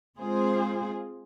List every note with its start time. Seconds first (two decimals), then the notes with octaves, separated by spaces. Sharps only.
0.19 G#3 C4 F4 G#4 C5